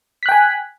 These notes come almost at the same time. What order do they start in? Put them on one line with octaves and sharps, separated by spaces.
B6 F#6 G5 G#5